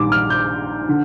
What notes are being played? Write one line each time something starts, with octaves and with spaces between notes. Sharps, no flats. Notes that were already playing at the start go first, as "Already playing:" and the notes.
Already playing: A#1 G#2 D#3 G3 D6
F6
G6
D3